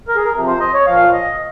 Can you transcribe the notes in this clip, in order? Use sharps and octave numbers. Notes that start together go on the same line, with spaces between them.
A#4
G#4
A#4
C3 F3
C5
D#5
C#5
A#2 F3 F5
D#5